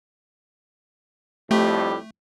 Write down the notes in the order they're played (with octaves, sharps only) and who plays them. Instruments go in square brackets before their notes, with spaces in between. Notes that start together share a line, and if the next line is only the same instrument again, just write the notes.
[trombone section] F2 A2 G3 [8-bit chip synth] A3 [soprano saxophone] G4